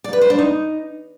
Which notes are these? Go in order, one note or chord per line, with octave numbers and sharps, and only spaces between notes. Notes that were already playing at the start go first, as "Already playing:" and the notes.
D5
B4
C5
D4
D#4